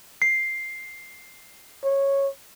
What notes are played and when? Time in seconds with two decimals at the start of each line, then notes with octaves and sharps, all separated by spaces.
0.22 C7
1.84 C#5